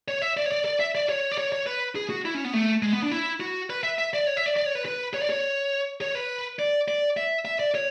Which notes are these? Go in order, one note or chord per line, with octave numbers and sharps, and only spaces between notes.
C#5
E5
D5
C#5
D5
D5
E5
D5
C#5
D5
C#5
C#5
B4
G#4
F#4
E4
C#4
B3
A3
G#3
B3
D4
E4
F#4
B4
E5
E5
D5
C#5
E5
D5
D5
C#5
B4
B4
C#5
D5
C#5
C#5
B4
D5
D5
E5
E5
D5
C#5